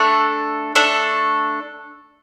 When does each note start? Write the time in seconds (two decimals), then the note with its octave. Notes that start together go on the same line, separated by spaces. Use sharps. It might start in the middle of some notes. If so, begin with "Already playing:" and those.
Already playing: A3 D4 A4
0.75 A3 D4 A4